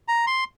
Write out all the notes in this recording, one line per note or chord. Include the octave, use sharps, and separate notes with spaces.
A#5
C6